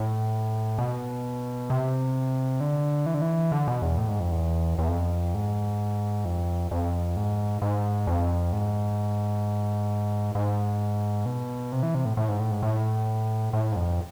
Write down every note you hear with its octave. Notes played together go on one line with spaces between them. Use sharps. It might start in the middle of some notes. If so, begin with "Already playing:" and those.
Already playing: A2
B2
C3
D3
E3
D3
E3
D3
B2
E2
A2
G#2
F2
E2
E2
F2
G#2
F2
F2
G#2
G#2
F2
G#2
G#2
B2
C3
E3
C3
A2
A2
G#2
A2
G#2
A2
A2
G#2
F2